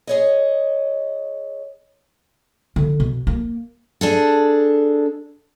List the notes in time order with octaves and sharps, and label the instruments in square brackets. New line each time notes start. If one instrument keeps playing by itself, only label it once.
[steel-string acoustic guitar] G#4 C#5 D#5
[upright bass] D3
B2
A#3
[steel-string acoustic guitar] D4 G#4 A4